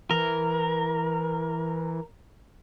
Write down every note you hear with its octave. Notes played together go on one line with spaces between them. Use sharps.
E3 A#4